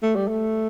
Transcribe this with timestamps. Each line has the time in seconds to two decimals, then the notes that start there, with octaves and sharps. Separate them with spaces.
0.03 A3
0.16 G3
0.28 A3